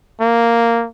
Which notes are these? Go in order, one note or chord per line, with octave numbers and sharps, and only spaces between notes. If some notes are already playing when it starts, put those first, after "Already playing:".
A#3